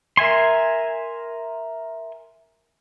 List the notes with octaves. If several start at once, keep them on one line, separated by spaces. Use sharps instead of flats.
A#4 E5 G#5 C6